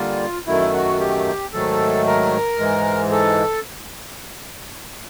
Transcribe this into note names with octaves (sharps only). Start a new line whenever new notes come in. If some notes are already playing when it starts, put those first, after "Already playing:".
Already playing: D3 G3 A#3 F4
F#2 D#3 F#3 A3 E4
F#4
G4
G#2 D#3 F#3 A3 A4
A#4
G#2 E3 G#3
A4